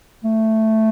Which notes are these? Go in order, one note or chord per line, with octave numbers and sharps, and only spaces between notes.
A3